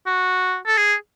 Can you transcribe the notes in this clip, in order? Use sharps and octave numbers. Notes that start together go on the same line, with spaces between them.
F#4
A4
G#4